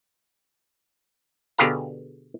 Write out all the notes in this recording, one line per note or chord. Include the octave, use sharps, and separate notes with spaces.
B2 D3 G4 G#4 F5 A#5